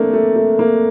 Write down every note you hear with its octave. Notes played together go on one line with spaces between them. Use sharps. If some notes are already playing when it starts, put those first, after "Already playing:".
Already playing: E3 A3 A#3 C4 D4
A3
A3
A#3